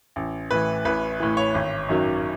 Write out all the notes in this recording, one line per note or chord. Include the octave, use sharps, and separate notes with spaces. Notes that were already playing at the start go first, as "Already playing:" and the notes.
A1
A2 E3 B4
A1 B4
A2 E3
C#5
G#1
F#2 D#3 F#3